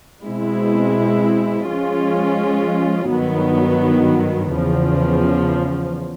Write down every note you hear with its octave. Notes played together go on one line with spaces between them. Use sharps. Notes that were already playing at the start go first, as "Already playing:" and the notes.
B2 G#3 C4 E4
F3 G#3 C#4 F4
G2 D#3 F#3 B3
E2 C#3 F3